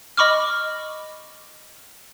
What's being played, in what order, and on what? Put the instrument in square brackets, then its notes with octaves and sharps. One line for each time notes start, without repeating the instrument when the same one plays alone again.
[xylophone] D#5 B5 C#6 D6 F6